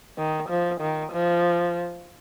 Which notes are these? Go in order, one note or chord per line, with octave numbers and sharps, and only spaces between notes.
D#3
F3
D#3
F3